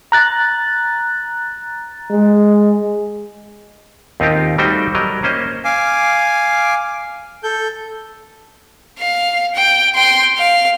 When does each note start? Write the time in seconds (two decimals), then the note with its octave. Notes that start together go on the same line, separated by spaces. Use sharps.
0.12 A#5 F#6 A6
2.11 G#3
4.20 D#2 C4 D#4 F4 G4
4.58 G3 A3 D#4 F#4 C5 G5
4.95 F#3 G3 A#4 D#5
5.23 A#3 C#4 C5 D#5
5.65 F5 G#5 D6
7.43 A4 G6
8.99 F5
9.55 G5
9.95 G5 C6
10.38 F5